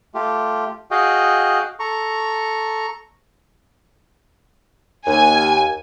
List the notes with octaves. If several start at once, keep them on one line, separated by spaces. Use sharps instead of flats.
A3 F4 G4
F#4 G#4 D#5 F5 G5
A4 A#5 C#6
D#2 G#5